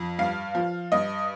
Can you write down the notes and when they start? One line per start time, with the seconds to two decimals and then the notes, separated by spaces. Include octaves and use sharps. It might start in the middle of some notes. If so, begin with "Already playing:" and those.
Already playing: F2
0.19 G2 F5
0.55 F3
0.92 G2 D#5